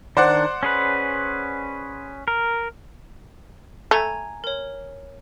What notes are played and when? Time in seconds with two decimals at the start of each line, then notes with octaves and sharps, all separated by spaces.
0.17 D#3 D4 C5 D5 F#5
0.63 C#4 G#4 B4
2.28 A#4
3.91 A3 G#5 A#5 G#6
4.44 A#4 C#5